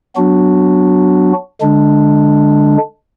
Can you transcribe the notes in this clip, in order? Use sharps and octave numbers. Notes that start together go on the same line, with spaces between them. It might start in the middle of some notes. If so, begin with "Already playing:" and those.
F#3 B3 D4 F#4
D3 G#3 D4